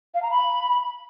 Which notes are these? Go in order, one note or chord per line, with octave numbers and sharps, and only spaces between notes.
F5
A#5
B5